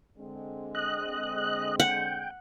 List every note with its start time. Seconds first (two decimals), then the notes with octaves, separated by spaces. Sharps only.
0.17 D3 G#3 C4
0.75 D#5 F#6
1.80 F#5 G5